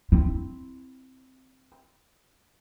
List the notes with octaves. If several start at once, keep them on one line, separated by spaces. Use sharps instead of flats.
C4 E4